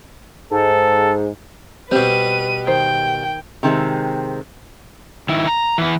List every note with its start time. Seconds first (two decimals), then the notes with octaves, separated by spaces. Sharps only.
0.51 G#2 A4
1.91 B2 G3 C4 G4 B4 D#7
2.67 D#3 C5 G5
3.63 C3 D#3 G#3 B3 C4
5.29 D#3 E4
5.47 A#5
5.78 E3 B3